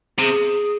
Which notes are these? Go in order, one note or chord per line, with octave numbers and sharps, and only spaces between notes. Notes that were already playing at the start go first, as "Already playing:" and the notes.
C3 G#4